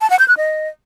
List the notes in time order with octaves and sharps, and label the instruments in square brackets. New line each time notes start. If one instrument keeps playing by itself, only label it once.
[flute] A5
F#5
G6
F#6
D#5